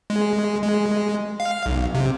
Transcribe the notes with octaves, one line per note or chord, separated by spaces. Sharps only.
G#3
G#3
F5
B1
C3